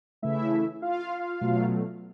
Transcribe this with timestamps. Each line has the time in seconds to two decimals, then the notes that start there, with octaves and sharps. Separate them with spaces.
0.22 C#3 E3 A3 E4 E5
0.82 F4 F5
1.41 B2 F#3 A3